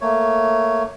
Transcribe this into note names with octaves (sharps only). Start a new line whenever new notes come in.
A3 A#3 C#5